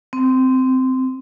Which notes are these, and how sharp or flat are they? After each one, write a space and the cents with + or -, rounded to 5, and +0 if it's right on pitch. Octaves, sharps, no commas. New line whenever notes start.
C4 -15